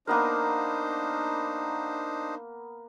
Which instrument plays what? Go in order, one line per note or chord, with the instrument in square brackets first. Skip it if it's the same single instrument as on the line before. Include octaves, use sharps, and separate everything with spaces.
[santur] A#3 B3 A#4 [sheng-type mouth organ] D4 D#4 C5